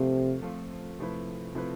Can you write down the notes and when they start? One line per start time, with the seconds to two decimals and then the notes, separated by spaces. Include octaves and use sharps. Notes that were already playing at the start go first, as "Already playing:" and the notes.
Already playing: C3 F3 A3 C4 F4 A4
0.42 F3 A3 C4 F4 A4
0.98 C3 F3 A3 E4 B4
1.54 C3 F3 A3 E4 B4